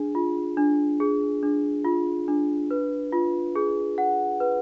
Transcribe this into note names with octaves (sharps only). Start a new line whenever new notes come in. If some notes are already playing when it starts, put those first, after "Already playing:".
Already playing: D4 G#4
F4
D4
G#4
D4
F4
D4
B4
F4
G#4
F#5
B4